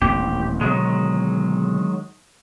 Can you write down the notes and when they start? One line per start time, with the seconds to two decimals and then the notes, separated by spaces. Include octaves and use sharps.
0.02 D#1 A1 C4 G4
0.61 B2 D3 D#3 F#3 G#3